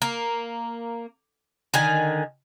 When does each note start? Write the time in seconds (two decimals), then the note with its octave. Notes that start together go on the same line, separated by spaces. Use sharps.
0.02 A#3
1.74 D3 D#3 G#5